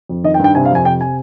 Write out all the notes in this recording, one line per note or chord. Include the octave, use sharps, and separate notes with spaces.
F2
D#3 D#5
G5
G2
G5
C3 G#5
F5
F2 G#5
C3 G5
G#5